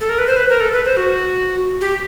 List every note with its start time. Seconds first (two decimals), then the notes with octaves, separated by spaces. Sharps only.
0.01 A4
0.09 A#4
0.18 B4
0.27 C5
0.36 B4
0.49 A#4
0.60 A4
0.72 B4
0.85 C5
0.97 F#4
1.81 G4